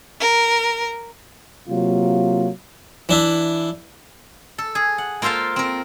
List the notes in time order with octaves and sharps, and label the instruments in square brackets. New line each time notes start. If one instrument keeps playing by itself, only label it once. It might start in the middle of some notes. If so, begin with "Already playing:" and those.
[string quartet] A#4
[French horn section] C3 F#3 A#3 F4
[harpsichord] E3 D4 E4
[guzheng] A4
G#4
F#5
A#3 F4 A4 C5 F5
C4 A#4